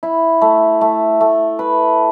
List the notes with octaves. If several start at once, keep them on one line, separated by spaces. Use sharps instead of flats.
E4
A3
A3
A3
B4